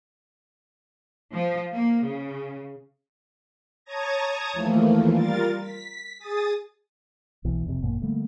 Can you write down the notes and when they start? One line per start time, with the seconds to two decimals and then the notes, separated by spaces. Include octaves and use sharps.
1.34 F3
1.74 A#3
2.04 C#3
3.85 C#5 A5 A#5 D#6 G#6 A#6
4.53 D#2 E3 F3 A3 A#3
5.11 G3 F4 A#4 A6
5.61 B6
6.19 G#4 D#6 A6
7.44 B1 B2 E3
7.66 F1 F2 C3
7.82 G#1 F#2 A#2 A#3
8.02 D3 G3 A3 A#3